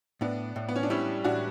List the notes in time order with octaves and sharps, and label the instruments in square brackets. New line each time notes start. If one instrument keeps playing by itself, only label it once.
[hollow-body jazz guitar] A2 [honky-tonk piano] B3 D4
[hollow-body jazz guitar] A2
[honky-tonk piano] B3
C#4
D4
[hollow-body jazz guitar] G3 [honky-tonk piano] C#4 E4
[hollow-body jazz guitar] A2 [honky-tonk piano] D4 F#4